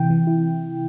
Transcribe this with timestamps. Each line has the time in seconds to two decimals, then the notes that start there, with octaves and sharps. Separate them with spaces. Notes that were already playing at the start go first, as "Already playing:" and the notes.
Already playing: C3 E3 G5
0.10 E3
0.27 E4